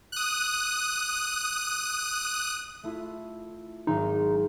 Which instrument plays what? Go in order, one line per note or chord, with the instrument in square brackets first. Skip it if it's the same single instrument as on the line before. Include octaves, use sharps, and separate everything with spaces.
[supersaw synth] D#6 F#6
[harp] A3 E4 F4
[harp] G#1 F#3 C6 [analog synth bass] D#4